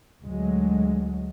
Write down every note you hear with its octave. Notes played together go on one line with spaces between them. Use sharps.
D2 F#3 G#3